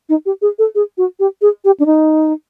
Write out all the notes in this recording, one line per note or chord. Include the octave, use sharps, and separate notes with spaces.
D#4
G4
G#4
A4
G#4
F#4
G4
G#4
G4
D4
D#4